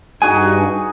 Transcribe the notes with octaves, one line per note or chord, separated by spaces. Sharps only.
G2 D#4 F#4 G#4 G#5